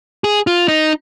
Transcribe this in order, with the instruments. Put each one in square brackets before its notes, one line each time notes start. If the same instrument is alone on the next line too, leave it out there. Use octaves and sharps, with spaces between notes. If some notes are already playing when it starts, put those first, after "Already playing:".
[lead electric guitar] G#4
F4
D#4